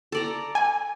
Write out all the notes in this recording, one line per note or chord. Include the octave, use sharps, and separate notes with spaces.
A4 D5 A#5
G#5